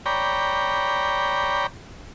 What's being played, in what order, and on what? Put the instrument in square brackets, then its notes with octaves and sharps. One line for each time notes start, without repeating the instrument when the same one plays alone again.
[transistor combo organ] C#5 D5 G5 A#5 B5